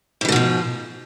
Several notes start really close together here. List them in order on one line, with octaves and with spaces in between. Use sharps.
G#2 E3 D3 B2 F3